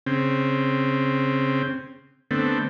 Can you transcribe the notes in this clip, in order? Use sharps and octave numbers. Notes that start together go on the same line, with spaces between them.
C#3 C4
D3 A3 B3 C4